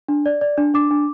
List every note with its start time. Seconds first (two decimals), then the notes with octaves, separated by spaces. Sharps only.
0.08 D4
0.26 D5
0.41 D5
0.58 D4
0.74 D4 D6
0.90 D4